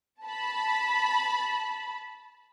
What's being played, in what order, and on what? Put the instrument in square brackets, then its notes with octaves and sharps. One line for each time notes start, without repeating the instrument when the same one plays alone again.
[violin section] A5 B5